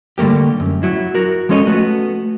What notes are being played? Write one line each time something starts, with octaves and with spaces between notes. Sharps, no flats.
D3 G3 A3 A#3 G4
F#2
F#3 E4
F#4 A#4
F3 G#3 C#4 A4 C#5 D#5
A3 B3 F#4